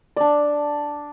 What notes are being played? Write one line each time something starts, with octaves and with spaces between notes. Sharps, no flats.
D4 D5